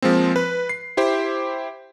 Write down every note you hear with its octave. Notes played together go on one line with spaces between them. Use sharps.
F3 G#3 A#3 C4
B4
C7
E4 G4 C5